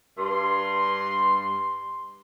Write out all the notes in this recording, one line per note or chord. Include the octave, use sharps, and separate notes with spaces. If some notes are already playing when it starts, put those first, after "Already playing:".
G2 C6